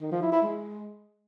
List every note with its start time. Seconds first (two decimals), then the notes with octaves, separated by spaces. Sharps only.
0.02 D#3
0.12 F3
0.22 E4
0.32 E4
0.42 G#3